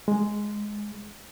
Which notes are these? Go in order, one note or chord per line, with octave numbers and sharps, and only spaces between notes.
G#3